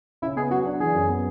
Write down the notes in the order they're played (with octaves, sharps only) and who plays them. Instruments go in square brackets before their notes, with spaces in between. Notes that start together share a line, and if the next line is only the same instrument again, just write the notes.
[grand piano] C#3 [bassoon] E4
[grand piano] B3 [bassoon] G#4
[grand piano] F#3 [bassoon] F#4
[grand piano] D4
[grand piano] E3 [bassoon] G#4
[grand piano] F#2
B3